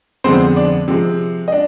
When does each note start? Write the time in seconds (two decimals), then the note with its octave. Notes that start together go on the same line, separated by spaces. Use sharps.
0.24 F2 D3 F3 G#3 B3 C4 C5
0.56 D4 D5
0.88 C3 F3 G#3 C4
1.48 D#5
1.52 D4 D5